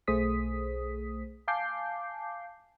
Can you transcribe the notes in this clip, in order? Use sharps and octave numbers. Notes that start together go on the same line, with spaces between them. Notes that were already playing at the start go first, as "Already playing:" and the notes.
B1 A3 G#4 C5 D#6 B6
F5 G#5 A5 D6 G6 C7